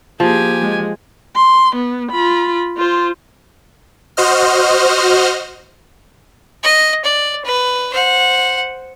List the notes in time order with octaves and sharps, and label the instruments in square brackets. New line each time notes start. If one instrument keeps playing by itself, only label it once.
[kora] F3 [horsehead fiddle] A#3 G#4 [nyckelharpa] G4 G#5
[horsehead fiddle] G#3
[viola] C6
B3
F4 B5
F4 C5
[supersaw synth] F#4 C5 D#5 F6
[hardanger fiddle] D#5
D5
B4
C5 F#5